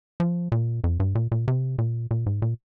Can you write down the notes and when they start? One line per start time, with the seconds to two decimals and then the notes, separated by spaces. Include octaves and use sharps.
0.20 F3
0.52 A#2
0.84 F2
1.00 G2
1.15 A#2
1.32 A#2
1.48 C3
1.78 A#2
2.11 A#2
2.26 G#2
2.42 A#2